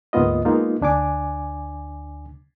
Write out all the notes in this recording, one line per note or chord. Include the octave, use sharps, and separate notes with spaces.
D2 G#2 A#3 B3 F4 D#5
G#3 A#3 B3 D#4 F4
D2 D4 G#5 D6